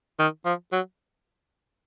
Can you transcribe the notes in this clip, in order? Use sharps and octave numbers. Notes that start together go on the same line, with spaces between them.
D#3
F3
F#3